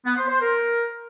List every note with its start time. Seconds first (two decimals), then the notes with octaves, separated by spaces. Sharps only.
0.05 B3
0.17 C5
0.29 C5
0.40 A#4